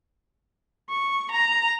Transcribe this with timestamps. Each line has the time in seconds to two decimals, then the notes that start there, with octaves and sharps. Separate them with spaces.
0.90 C#6
1.31 A#5